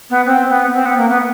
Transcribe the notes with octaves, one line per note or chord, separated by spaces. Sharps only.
B3
C4
B3
C4
B3
A#3
B3